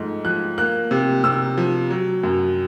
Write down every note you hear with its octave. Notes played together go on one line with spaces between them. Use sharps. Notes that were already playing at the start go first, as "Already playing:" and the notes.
Already playing: G#2 F3 A3
F3 F#6
A#3 F#6
C3
C3 E6
F3
F#3
F#2